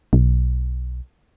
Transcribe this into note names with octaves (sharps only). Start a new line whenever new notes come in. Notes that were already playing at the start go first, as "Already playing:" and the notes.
B1